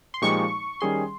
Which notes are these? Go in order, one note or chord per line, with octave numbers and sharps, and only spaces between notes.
C6
A#2 F3 G#3 D#4 G4 C#6
D#3 G3 C#4 G#4 C6